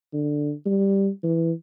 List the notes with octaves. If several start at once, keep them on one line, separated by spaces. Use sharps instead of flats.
D3
G3
E3